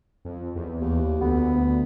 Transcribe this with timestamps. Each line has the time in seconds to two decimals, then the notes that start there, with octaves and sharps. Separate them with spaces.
0.25 F2
0.56 E2
0.76 D#2
1.21 D2 B3